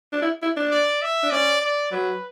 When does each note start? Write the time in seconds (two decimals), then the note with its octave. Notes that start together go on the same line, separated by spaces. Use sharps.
0.12 D4
0.22 E4
0.42 E4
0.56 D4
0.71 D5
1.02 E5
1.23 D4
1.31 C#4 D5
1.62 D5
1.92 F#3 B4